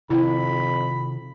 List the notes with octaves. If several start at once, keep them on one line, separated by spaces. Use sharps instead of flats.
F2 C3 D#3 E4 B5